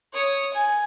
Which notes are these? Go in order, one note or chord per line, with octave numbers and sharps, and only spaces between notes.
C#5 D#6
G#5